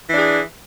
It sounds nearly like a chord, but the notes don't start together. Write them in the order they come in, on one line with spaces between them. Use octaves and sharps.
E3 D4 G#4